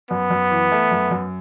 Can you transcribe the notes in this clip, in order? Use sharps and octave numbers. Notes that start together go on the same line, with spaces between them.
F#2 B3
F#2
E3
A3
F#2
F#2